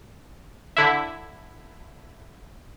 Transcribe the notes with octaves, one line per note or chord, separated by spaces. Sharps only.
D3 E4